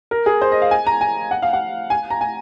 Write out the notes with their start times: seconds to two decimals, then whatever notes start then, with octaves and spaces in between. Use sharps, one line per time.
0.11 A#4
0.26 G#4
0.42 C5
0.51 D#5
0.62 F5
0.71 G#5
0.87 A#5
1.01 G#5
1.31 F#5
1.42 F5
1.53 F#5
1.90 G#5
2.10 A#5
2.21 G#5